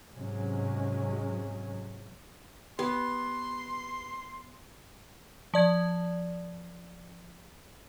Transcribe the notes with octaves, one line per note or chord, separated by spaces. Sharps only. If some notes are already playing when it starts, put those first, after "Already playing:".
G#2 C3 F#3 G#3 C#4
B3 G4 C6
F3 D5 G#6